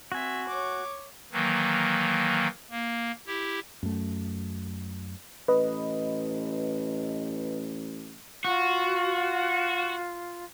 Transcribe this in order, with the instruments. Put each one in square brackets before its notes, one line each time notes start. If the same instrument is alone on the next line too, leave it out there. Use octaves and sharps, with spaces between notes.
[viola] C4 E5 [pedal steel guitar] F#4 G#5
[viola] C#5 D6
[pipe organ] D#3 E3 F#3 A#3
A#3
E4 G4
[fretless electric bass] F#2 A3
[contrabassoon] A1 [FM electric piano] B4 D#5
[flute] F4 [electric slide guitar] F#4